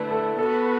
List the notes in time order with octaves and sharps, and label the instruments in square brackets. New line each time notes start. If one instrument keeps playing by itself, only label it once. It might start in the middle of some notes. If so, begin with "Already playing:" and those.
Already playing: [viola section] D3 A3 E4 [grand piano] B4
[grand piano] A4
[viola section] B3 F#4 B4 [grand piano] A4